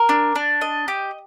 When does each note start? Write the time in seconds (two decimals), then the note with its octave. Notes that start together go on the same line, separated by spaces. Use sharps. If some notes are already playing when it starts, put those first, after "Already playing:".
Already playing: A#4
0.09 D4
0.36 D4
0.61 D#5
0.88 G4